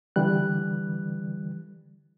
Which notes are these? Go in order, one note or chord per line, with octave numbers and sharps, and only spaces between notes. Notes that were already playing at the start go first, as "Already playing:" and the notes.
D3 E3 G3 F#6